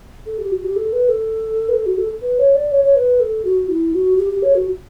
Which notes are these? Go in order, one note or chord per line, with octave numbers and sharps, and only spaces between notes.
A4
G4
F#4
G4
A4
B4
A4
B4
A4
F#4
A4
B4
C#5
D5
C#5
C#5
B4
A4
F#4
E4
F#4
G4
G4
C#5
F#4